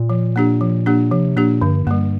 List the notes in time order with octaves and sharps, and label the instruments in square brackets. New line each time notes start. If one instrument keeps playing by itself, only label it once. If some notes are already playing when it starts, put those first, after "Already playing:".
Already playing: [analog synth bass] A#2
[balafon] F3
A#3 D4 G4
F3
A#3 D4 G4
[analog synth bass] C3 [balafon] F3
[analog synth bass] A#2 [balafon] A#3 D4 G4
[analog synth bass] G2 [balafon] D3
[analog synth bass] G2 [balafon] G3 A#3